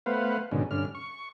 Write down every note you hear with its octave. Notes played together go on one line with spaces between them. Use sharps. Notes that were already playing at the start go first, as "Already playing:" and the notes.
A3 B3 B4 C5 F5 F#5
G#2 B2 D3 D#3 C#4
G2 D3 C#4 F6
C#6